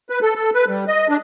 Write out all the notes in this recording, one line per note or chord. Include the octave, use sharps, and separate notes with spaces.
B4
A4
A4
B4
G3
D#5
D4